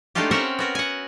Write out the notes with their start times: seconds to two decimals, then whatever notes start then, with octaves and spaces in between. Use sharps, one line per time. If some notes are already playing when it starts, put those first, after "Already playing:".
0.15 G#3 A3 D4 D#4 F4 G4
0.31 C4 C#4 A#4 C5 E5 F#5
0.59 B3 F#4 A#4
0.75 F#5 G#5